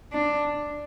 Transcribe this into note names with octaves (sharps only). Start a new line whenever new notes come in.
D4